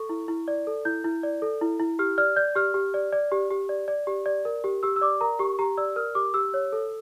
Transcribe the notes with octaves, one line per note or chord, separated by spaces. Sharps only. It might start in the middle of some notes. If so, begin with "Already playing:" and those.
Already playing: A4 C#6
E4
E4
D5
A4
E4 G6
E4
D5
A4
E4
E4
G4 F6
D5 F6
D5 G6
G4 F6
G4
D5
D5
G4
G4
D5
D5
G4
D5
A#4
G4
G4 E6
E6
D5 D6
A#4 A#5
G4 C#6
G4 A#5
D5 E6
A#4 F6
G4 D6
G4 E6
C#5
A4